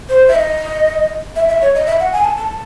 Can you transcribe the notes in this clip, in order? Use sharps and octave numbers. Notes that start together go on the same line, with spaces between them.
C5
E5
D#5
E5
E5
C#5
D#5
E5
F#5
G#5
A5
A5